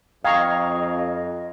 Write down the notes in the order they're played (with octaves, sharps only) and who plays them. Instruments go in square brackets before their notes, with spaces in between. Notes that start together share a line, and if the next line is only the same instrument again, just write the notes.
[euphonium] F2 [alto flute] D#5 [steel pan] F5 A#5 C#6 [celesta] G5 D#6 G#6